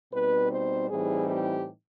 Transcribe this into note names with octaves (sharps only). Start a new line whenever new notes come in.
B2 G3 C4 D#4 B4
C5
A2 E3 G3 C4 D#4 G#4
G4